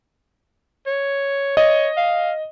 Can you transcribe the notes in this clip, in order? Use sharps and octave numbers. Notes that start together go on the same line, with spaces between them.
C#5
C#5 D#5
F5